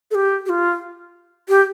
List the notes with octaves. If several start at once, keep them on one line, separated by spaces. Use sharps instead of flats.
A4
G4
G4
F4
G4